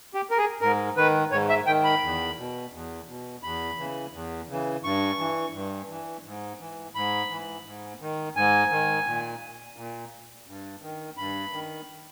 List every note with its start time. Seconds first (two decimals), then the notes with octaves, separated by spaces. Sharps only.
0.14 G4
0.31 A#4
0.38 G#4
0.61 G#2 A#4
0.97 D#3 B4
1.32 G#2 C#5
1.49 E5
1.67 D#3 G5
1.84 B5
2.02 E2
2.38 B2
2.73 E2
3.08 B2
3.43 E2 B5
3.78 C#3 E3
4.13 E2
4.49 C#3 E3
4.84 G2 C#6
5.19 E3
5.54 G2
5.89 E3
6.25 G#2
6.60 E3
6.95 G#2 B5
7.30 E3
7.66 G#2
8.01 D#3
8.36 G#2 G#5
8.71 D#3
9.06 A#2
9.77 A#2
10.47 G2
10.82 D#3
11.17 G2 B5
11.53 D#3